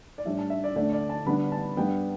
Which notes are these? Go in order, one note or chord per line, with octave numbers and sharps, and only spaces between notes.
D5
A2 G3 D4 E5
A5
E5
D5
D2 D3 A3 D4 D5
D5
A5
D3 G3 B3 D4 B5
A5
G2 G3 B3 G5